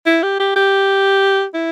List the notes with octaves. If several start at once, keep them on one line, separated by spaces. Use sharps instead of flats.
E4
G4
G4
G4
E4